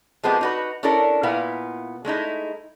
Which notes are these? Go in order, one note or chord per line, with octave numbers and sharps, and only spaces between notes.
F3 G#3 A3 B3 C4 G4
D#4 F#4 B4
C#4 D4 E4 A4 A#4
A#2 B3 E4 F5
G#3 A3 D#4 E4